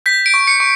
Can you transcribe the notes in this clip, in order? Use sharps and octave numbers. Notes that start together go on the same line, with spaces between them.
G6 B6
D7
C#6
C#7
C#6